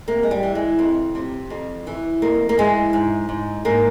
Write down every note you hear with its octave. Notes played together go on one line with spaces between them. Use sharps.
C3 A#3
G#3
G3
E3
G#3
F2
C3
F2
E3
F2 A#3
A#3
E3 G#3
G#2
G#2
G#2 A#3